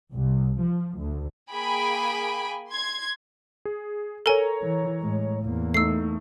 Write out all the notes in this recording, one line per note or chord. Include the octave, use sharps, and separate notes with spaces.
C2
F3
D2
A#3 G#4 G5 G#5 B5 D7
C6 G#6
G#4
A4 A#4 C#5 G#5 A#5
E3
A2 G#3
E2 A#3
A3 D#4 E6 C7